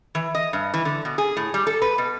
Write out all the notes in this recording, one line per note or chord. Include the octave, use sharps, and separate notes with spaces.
E3
D#5
G2
E3
D3
B2
G#4
A2
G3
A4
B4
B2